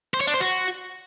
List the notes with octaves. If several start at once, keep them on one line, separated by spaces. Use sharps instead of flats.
C5
C#5
D4
C5
F#4